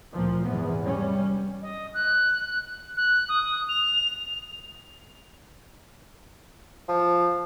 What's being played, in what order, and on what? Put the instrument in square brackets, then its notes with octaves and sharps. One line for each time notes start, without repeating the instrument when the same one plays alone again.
[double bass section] D2 A#2 F3
E2 G#2 C3 B3
G3 C#4
[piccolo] D#5
F#6
F#6
D#6
F7
[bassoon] F3